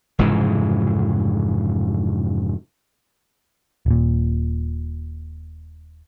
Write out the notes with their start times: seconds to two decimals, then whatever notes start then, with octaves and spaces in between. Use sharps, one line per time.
0.19 F1 G#2 C#3 E3
3.86 D#1 A#2